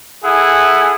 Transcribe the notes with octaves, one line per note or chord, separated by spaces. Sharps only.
E4 G#4 A4 F#5 G#5 D#6